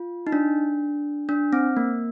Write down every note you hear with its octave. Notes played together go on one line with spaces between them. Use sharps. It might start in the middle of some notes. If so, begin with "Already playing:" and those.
Already playing: F4
D#4
D4
D4
C4
A#3